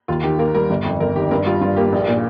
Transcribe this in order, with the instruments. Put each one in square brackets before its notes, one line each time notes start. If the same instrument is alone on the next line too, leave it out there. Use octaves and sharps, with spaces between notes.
[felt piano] D#2 [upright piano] F4
[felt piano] D#3 [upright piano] G4
[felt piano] A#3 [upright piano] A#4
[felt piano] G3 [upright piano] A#4
[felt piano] G1
F2
[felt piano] G1 [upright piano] A#4
[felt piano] D#3 [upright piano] G4
[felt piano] G2 [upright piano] A#4
[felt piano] G3 [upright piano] F4
[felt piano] G2 [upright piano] F4
[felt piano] A#3 [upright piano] G4
[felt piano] A#1
A#2